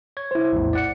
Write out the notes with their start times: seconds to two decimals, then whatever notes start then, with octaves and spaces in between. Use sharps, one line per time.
0.17 C#5 G#6
0.31 E4 C5
0.52 A#1 E2 A2
0.73 D5 F#5 C#7